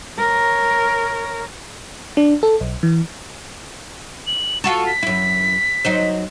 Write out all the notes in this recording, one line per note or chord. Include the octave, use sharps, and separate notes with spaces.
A#4 C#5
D4
A4
B1
E3
F#7
F4 F#4 A4 C#6
B6
F#2 E4
F#3 D#4 C5